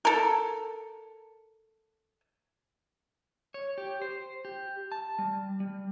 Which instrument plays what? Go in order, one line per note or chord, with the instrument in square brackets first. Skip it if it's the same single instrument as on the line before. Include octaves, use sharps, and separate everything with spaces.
[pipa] A4 A#4
[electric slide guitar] C#5
G4
C5
G4
A5
G3
G3